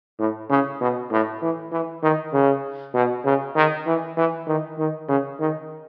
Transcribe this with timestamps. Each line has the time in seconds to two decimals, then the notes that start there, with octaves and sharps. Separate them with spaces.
0.19 A2
0.50 C#3
0.81 B2
1.12 A2
1.42 E3
1.72 E3
2.03 D#3
2.33 C#3
2.94 B2
3.25 C#3
3.56 D#3
3.86 E3
4.17 E3
4.47 D#3
4.78 D#3
5.09 C#3
5.40 D#3